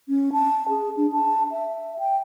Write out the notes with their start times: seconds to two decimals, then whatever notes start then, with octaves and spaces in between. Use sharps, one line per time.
0.09 C#4
0.33 A5
0.69 G#4
0.97 D4
1.12 A5
1.51 E5
1.98 G5